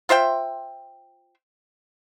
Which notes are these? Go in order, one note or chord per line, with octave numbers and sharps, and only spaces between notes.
F4 C5 E5 G5